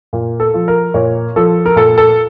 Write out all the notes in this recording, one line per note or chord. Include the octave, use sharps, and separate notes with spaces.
A#2
A4
F3
A#4
A#2 C#5
F3 A4
A#4
A#2 A4
A4